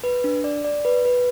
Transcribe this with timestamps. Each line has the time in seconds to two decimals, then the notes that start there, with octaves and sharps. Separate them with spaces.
0.04 B4
0.24 D4
0.44 D5
0.65 D5
0.85 B4
1.05 B4